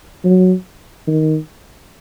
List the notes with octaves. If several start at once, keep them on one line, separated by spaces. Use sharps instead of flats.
F#3
D#3